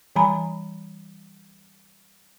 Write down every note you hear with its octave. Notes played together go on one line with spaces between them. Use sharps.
E3 G3 G#5 A#5 B5